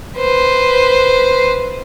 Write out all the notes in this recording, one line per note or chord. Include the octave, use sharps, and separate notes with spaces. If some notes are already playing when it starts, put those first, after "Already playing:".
B4 C5